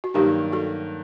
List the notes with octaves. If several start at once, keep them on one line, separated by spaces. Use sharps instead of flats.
F#4
G2 D#3 F#3 A#3 D#4 G4
F#4 A4